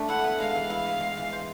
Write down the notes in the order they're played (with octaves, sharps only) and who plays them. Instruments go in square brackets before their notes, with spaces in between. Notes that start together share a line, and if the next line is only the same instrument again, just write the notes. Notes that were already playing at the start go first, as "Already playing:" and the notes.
Already playing: [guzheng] A3 D4
[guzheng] E4 [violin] F#5
[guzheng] B3
[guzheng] G#3 [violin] F5
[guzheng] E3
E4
B3
G#3
E3
C5